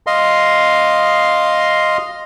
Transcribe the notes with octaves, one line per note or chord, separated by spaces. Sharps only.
D#5 F5 C6